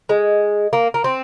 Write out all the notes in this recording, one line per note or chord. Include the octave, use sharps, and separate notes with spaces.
G#3
A#3
A#3
C4